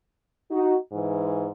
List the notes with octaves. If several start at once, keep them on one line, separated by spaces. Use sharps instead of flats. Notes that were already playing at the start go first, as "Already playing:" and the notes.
D#4 F#4
G#2 E3